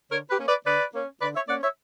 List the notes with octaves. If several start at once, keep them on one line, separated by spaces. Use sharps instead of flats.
D3 A#4 C#5
G4 B4
A#3 C#4
B4 D5
D3 B4 D5
A#3 C#4
D3 B4 D5
C#5 E5
A#3 C#4 D5 F#5
C#5 E5